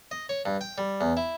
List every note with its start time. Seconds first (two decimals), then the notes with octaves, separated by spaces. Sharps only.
0.11 D#5
0.29 C#5
0.46 G2
0.61 G5
0.78 G3
1.01 E2
1.17 E4